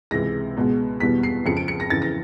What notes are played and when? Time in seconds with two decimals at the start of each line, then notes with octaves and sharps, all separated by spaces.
0.11 C#2 C3 E3 G#3 A#6
0.56 C#2 B2 G#3 B3
1.00 E2 B2 G3 B3 B6
1.23 C7
1.46 F2 C#3 F3 C#7
1.57 D7
1.68 C#7
1.80 A#6
1.90 F2 C#3 E3 A6
2.02 A#6